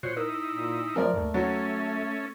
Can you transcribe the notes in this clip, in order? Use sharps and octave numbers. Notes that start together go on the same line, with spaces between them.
A#2 F#4 C5 C#5
D#4 E4 A#4
A#2
F3 F#3 A3 C4 A#4 D5
D#2 G#2 A3
F#3 C#4 A4